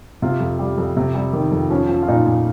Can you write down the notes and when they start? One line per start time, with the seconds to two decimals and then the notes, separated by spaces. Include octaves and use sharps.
0.22 C3 F4
0.40 F2
0.59 G3
0.78 F2
0.97 C3
1.15 G3
1.33 D#3
1.52 F2
1.70 F3 C#4
1.89 F3
2.03 F4
2.08 A#2 D#4
2.26 A#2